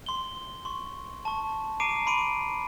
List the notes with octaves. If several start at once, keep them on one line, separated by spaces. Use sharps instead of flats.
C6 G7
C6 C#6
A5 C#6
A#5 D6 C7 D7 D#7
B5 C6 D7 D#7